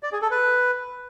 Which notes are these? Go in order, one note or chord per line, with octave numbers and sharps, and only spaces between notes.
D5
G#4
A4
B4